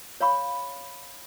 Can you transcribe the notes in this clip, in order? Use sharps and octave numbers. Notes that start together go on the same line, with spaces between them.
C#5 F5 B5 C#6